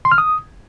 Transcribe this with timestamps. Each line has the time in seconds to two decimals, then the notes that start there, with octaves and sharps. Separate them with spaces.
0.05 C6
0.12 F6
0.18 D#6